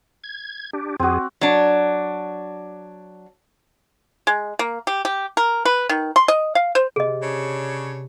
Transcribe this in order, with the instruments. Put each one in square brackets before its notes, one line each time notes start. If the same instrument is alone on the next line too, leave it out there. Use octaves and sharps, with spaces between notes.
[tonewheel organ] G#6
D4 G4
[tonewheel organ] F2 G#4 [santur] C4 F#4
[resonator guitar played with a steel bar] F#3 D4
[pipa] G#3
A#3
G4
G4
A#4
B4
D#3
C6
D#5
F5
C5
[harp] C3 [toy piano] G#4 D#5
[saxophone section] C#3 D4 C#5